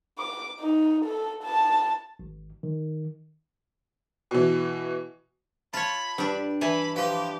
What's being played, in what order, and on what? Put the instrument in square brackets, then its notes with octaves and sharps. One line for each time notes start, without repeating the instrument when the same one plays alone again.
[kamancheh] D6
D#4
A4
A5
[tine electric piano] G#1
D#3
[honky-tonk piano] B2 E3
[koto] F4 C#5 [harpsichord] A5 [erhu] B5
[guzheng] G2 [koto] G3 D4
[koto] E3 G#5 A5 [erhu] B5
[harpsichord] F3 B4 [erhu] G4